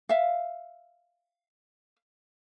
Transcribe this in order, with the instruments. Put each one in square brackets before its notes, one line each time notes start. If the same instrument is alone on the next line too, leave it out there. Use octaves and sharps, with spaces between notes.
[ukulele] E5 F5